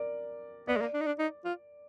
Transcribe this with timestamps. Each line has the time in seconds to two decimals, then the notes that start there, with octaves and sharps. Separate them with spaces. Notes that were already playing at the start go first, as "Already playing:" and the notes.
Already playing: A#4 D5
0.67 B3 D5
0.76 G#3
0.81 A#3
0.94 D4
1.01 D#4
1.06 D4
1.19 D#4
1.45 F4